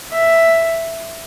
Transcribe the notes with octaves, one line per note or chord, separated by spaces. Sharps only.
E5